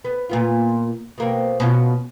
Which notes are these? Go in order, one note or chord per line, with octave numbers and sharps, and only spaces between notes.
B3
A#2 B3 F4
B2 A#3 C4
B2 C#4 F4